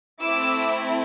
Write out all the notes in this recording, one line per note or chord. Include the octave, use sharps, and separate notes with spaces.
A3 C4 E4 D6 E6